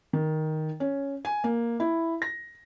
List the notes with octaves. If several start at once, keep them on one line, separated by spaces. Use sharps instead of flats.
D#3
C#4
G#5
A#3
E4
A#6